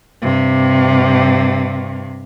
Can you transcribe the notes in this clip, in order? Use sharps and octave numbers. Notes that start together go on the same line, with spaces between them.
G2 C3